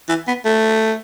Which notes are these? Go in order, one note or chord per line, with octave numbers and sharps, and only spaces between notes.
E3
B3
A3